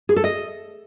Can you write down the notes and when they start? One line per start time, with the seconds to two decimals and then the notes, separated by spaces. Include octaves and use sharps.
0.09 G#4
0.16 A4
0.24 D#5